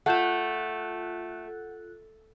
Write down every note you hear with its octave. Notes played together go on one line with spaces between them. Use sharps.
A3 F4 F#5 F#6 G6 E7